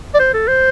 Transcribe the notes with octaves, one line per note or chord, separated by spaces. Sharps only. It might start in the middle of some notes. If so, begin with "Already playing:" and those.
D5
C5
A4
C5